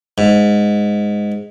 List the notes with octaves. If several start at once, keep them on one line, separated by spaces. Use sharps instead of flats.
G#2